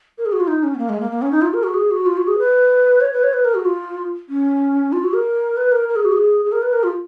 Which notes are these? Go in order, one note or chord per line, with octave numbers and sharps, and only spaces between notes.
A#4
G#4
F#4
F4
D#4
C#4
B3
A#3
G#3
A#3
A#3
C#4
D#4
F4
A#4
F#4
G#4
F#4
F4
F#4
G#4
B4
C#5
B4
C#5
B4
A#4
F#4
F4
C#4
F4
F#4
A#4
B4
A#4
A#4
G#4
F#4
G#4
G#4
A#4
B4
A#4
F4